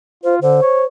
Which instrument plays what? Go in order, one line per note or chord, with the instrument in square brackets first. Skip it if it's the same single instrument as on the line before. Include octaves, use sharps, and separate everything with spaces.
[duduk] F4 [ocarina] C5
[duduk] D3 [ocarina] C5
[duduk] C#5